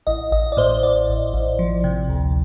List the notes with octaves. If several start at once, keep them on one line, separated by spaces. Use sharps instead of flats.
A1 D#5
A1 D#5
D5
A2 C5
A1 D5
A1
A1
F3
C3
D2